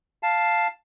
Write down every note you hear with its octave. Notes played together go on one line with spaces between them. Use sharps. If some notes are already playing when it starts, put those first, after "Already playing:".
F5 A5